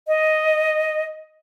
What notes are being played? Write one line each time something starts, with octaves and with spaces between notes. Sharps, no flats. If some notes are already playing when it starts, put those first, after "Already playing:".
D#5